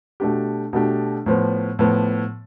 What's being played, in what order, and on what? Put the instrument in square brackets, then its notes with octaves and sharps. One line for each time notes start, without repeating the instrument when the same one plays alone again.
[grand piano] B2 A3 D4 G4
B2 A3 D4 G4
A2 F3 B3
A2 F3 B3